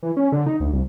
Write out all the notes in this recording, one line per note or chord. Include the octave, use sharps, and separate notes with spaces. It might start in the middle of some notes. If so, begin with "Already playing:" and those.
E3
C#4
D3
D#4
D2
C2